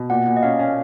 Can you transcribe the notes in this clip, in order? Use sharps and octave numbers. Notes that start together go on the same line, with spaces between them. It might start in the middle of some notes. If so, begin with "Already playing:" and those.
Already playing: B2
A#2 F#5
A#2
D#5
C#4 F5
C#4